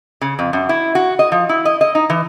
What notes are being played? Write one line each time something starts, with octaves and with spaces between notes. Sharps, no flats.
C#3
F2
F#2
E4
F#4
D#5
F3
E4
D#5
D#5
D#4
E3